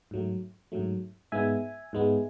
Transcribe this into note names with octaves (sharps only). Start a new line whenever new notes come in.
G#2 F#3 A3
G#2 F#3 A3
G#2 G#3 B3 E5 G#5
G#2 G#3 B3